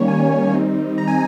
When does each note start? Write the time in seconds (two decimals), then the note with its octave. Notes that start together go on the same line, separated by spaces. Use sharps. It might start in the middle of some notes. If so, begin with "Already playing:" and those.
Already playing: D#3 G3 A#3 C#4 C#5
0.08 G#5
0.54 D#3 G3 C4 D#4
0.98 A#5
1.08 G#5